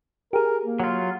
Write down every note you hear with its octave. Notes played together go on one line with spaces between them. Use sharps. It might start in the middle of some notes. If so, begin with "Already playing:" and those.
G4 G#4 A#4
A#3
F#3 F4